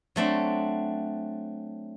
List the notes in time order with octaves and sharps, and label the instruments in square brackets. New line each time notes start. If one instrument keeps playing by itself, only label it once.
[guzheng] F#3 A3 C4 D4